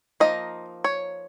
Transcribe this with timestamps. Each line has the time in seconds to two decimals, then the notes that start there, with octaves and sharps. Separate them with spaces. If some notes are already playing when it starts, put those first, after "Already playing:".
0.20 F3 A#3 D#4 D#5
0.84 C#5